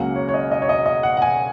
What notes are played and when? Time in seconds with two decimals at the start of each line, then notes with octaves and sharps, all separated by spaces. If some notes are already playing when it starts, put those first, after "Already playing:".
Already playing: C#2 C#3 F#3 A#3 F#5
0.16 C#5
0.29 C#5
0.34 D#5
0.51 D#5
0.62 C#5
0.69 D#5
0.86 D#5
1.03 F#5
1.17 F#5
1.22 G#5